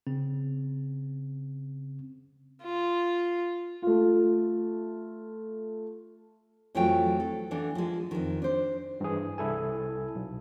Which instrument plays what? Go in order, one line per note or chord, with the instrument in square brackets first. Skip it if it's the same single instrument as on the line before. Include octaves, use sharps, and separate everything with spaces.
[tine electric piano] C#3 C4
[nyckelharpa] F4
[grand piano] A3 F4
[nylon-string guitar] F2 E3 F#3 A3 F4 G5
A4
E3 B3 D4 A4
F3 G#3
F2 D#3
D4 C5
[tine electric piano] G2 E3 G#4
C2 E4 A4 G#5
B1